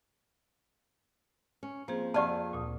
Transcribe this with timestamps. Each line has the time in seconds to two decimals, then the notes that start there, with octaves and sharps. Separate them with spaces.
1.63 C#4
1.88 F3 A#3 C4 G#4
2.14 F2 G4 G#4 D5 F5 F#5 A5 C#6
2.52 D2 A#2 D#6